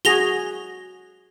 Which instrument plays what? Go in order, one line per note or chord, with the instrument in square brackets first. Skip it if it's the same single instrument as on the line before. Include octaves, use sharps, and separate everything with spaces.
[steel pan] F#4 G#4 [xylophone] A#6 F7 G7